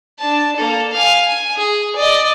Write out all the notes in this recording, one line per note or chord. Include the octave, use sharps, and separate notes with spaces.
D4 A5
A#3 A4
F5 G#5
G#5
G#4
D5 D#5